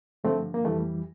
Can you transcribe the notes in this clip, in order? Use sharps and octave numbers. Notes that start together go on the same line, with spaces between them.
G2 D3 F3 A3 C4
A#3
F2 E3 G3 A3